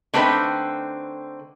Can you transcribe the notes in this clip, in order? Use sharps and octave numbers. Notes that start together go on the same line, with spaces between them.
D3 A3 C4 D#4 B4 G5